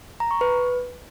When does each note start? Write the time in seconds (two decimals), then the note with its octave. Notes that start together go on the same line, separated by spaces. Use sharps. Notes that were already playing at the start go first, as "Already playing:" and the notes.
0.20 A#5
0.31 C#6
0.41 B4